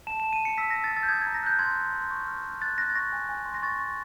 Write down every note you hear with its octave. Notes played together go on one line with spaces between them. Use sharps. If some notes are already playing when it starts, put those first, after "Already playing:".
A5 E7
E7
A5
D#7
A5 C#7
E6 B6
A#6
E6
A6
E6
A6
G6
D#6 G#6
G#6
A#5
A#6
F#6 G6
C6 G#6
C6
C6
C#6
F6
F6
F#6 A6
F#6 A#6
A6
C#6 A#6
G#5
G#5
C6
A#6
C#6 A6
C#6